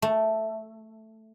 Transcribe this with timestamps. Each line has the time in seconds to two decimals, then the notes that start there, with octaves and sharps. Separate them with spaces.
0.02 A3